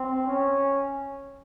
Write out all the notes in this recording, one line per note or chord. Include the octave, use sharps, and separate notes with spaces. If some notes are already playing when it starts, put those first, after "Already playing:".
Already playing: C4
C#4